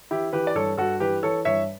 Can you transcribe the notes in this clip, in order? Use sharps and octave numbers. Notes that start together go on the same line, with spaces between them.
E3 E4 G4
E3 G4 B4
D5
G2 A4 C#5
G2 F#4 A4
E3 G4 B4
E3 A4 C#5
G2 C#5 E5